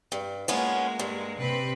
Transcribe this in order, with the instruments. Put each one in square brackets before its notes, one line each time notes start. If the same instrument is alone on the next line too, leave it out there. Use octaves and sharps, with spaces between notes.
[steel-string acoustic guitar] G2
[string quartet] G#3 A#3 [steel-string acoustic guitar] B3 C#4 F4
[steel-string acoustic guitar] G2
[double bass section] C3 [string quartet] C4 B4 B5